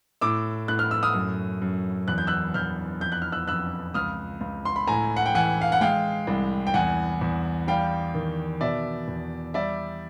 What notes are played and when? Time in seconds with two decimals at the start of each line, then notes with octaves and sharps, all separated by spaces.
0.21 A2 D6 E6
0.68 A2 F#6
0.79 F6
0.91 E6
1.03 D#6 F6
1.14 F#2
1.62 F#2
2.08 E2 F#6
2.18 G6
2.27 E6 F#6
2.54 E2 F6 G6
3.01 F2 G6
3.12 F#6
3.22 F6
3.32 E6 F#6
3.48 F2 E6 F#6
3.94 C#2 D#6 F6
4.41 C#2
4.65 C6
4.76 B5
4.87 A2 G#5 A#5
5.16 F#5
5.26 G5
5.35 E3 F#5 G#5
5.61 F5
5.72 F#5
5.81 G#3 F5 G5
6.27 C2
6.67 G5
6.74 E2 F#5 G#5
7.21 E2
7.67 G3 F5 G5
8.15 D#3
8.61 B2 D5 E5
9.08 E2
9.54 G3 D5 E5